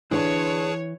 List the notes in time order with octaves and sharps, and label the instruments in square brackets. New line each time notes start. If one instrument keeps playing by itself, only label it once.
[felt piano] D3 [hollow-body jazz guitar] E3 [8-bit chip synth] G#4 B4 A5 [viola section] C#5